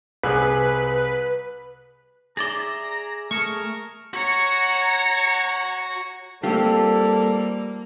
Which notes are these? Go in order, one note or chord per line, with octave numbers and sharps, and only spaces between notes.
C2 G#4 B4 F#6
G#4 D5 E5 A#5 D6 A6 A#6
A3 G#4 A#4 A5 C#6
F#4 C#5 A#5
G3 A#3 C4 F4 G4 A4